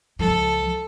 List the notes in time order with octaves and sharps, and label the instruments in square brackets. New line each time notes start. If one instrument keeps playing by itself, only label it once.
[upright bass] C#2 F3 [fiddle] A4